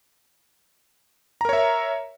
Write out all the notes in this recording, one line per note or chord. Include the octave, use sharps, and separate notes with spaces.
A#4 C#5 E5 A#5